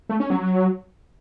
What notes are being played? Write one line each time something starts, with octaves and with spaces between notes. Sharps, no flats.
A3
C#4
F#3